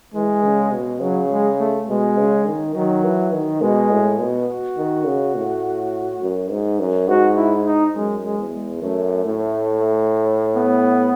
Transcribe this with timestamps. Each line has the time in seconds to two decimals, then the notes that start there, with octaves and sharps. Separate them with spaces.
0.15 E3 G#3
0.43 C#3
0.73 B2
1.01 C#3 F#3
1.30 G#3
1.60 A3
1.88 B2 G#3
2.17 C#3
2.46 D#3
2.74 D#3 F#3
3.04 E3
3.33 D#3
3.62 B2 G#3
3.91 A2
4.19 B2
4.48 F#4
4.77 D#3
5.06 C#3
5.35 A2
6.22 F#2
6.51 G#2
6.79 F#2
7.08 G#2 F#4
7.37 E4
7.66 D#4
7.95 F#2 G#3
8.24 G#3
8.38 E2
8.53 G#3
8.82 F#2 A3
9.25 A2
10.55 B3